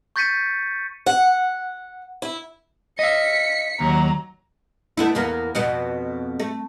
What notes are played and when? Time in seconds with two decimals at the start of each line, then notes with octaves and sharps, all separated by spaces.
0.16 C#6 G6 A6 B6 C#7 D#7
1.06 F#5
2.22 E4
2.99 D#5 F5 B6 C#7
3.80 D#2 F#3 A#5
4.97 A3 B3 E4
5.15 E2 A#3 B3
5.55 F2 B2 B3
6.40 A3